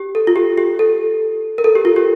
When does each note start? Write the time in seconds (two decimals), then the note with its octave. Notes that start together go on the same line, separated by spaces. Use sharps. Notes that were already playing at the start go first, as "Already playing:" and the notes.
Already playing: G4
0.15 A4
0.27 F4
0.36 G4
0.58 G4
0.79 A4
1.58 A#4
1.64 A4
1.75 G4
1.85 F4
1.96 G4